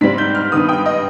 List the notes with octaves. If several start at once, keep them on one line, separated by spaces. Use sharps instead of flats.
G#2 G3 C4 B6
G6
F6
G2 D#3 B3 D#6
G5
D#5